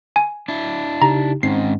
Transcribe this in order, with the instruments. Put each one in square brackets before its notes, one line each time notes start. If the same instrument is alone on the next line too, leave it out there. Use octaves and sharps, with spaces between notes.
[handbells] G#5
[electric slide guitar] D4 E4
[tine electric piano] C#3 D#4 G4 [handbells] A#5
[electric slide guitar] G#2 D#3 [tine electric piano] C4 C#4 [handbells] C7